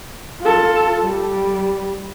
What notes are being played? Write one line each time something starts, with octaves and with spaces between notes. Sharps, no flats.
F4 A4
G3